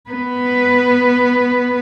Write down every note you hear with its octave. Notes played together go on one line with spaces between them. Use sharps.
B3 B4